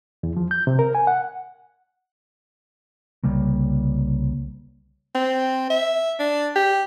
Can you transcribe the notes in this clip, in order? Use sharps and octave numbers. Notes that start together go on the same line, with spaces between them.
E2
F3
G6
C3
A#4
G#5
F#5
C2 C#3 G3 A#3
C4
E5
D4
G4